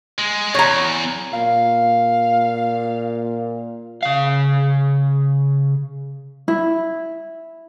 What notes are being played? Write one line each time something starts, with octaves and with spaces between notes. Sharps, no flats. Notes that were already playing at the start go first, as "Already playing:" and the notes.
G#3
E2 C#5 A#5
A#2 F5
C#3 F5
E4